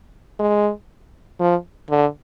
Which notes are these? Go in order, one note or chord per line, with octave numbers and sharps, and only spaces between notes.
G#3
F3
D3